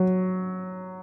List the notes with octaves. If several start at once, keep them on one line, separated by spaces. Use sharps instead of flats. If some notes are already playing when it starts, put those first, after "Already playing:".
Already playing: F#3